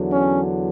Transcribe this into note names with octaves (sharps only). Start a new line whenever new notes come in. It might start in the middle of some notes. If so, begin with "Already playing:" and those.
Already playing: E2 D3 F#3
C#4